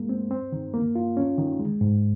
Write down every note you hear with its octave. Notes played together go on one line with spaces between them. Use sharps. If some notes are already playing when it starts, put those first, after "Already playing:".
Already playing: G#3 A#3
C4
C4
D#3
A#3
F4
C#4
D#3
G#3
G#2